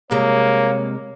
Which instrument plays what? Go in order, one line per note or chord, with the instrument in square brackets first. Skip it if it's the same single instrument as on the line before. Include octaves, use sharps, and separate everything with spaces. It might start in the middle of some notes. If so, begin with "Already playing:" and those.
[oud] C3 G3 G#3 [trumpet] A#3 [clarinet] C#5